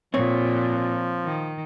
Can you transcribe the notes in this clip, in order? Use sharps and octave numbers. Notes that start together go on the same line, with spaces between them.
A#2 F3 C4 C#5
D#3